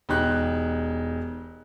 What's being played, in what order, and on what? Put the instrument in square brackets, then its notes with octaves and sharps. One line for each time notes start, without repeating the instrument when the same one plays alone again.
[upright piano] E1 D#4 G4 F#6